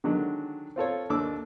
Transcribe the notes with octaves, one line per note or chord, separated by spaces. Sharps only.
D3 D#3 F#3 G#3 D4
C4 F4 A4 C#5
D#2 D4 A4 D6 E6